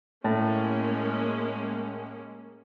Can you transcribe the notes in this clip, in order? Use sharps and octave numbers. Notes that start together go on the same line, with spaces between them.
A2 G#3 A#3 C#4